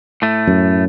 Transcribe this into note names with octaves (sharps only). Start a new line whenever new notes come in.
A2 A3
F#2